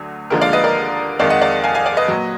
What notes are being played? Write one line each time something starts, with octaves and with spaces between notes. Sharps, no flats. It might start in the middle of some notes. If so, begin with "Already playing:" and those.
Already playing: D2 D3 F#3
D#2 D3 F3 G#3 A#4
D5 F5
B4 D#5
A#4 D5
F2 D#3 G#3 D5 F5
D#5 F#5
D5 F5
F5 G#5
F5 G#5
D5 F5
B4 D#5
A#2 F#3